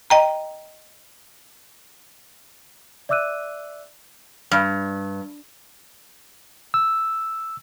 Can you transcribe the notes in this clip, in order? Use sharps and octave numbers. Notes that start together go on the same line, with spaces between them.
D#5 G5 A#5
D5 E5 D6 E6 F#6 D#7
G2
E6